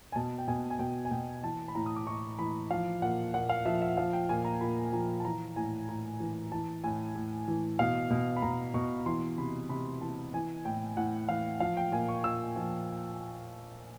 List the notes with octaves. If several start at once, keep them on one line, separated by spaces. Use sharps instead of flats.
G#5
B2 A5
G5
B2 G#5
G#5
B2 G5
G#5
B2 G5
E3 A5
B5
A2 A#5
D#6
D6
A2 C#6
E3 B5
F3 F5
A#2 F#5
A#2 F#5
F5
F3 E5
E5
F3 F5
G5
A#2 G#5
A#5
A#2 B5
F3 A#5
A5
E3 A#5
A2 G#5
A2 A#5
E3
E3 A5
A2 G#5
A2
E3
B2 F5
B2
B5
B2 A#5
B2 C#6
E3 C6
C3 B5
C3 B5
E3 A5
E3 G#5
A2 G5
A2 F#5
E3 F5
F3 F5
G5
A#2 G#5
C#6
A#2 E6
F3